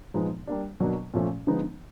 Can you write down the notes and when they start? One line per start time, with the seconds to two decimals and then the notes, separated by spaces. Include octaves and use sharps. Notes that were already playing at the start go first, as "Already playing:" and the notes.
0.14 A#2 F3 G#3 B3 D#4
0.47 G3 A#3 D4
0.80 B2 F#3 A#3 D4
1.14 A#2 F3 A3 C#4
1.47 D3 F3 G#3 B3 D#4